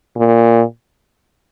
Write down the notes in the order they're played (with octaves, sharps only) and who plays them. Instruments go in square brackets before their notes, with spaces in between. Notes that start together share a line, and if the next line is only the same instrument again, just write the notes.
[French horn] A#2